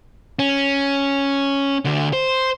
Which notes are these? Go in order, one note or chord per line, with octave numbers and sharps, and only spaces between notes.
C#4
D2 D3
C5